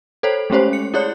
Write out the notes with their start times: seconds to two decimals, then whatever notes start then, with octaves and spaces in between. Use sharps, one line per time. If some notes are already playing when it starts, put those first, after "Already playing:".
0.23 A4 C5 C#5
0.50 G#3 A3 C#4 G4 C5 C#5
0.73 C#7
0.94 E4 G#4 C#5 D5 F#6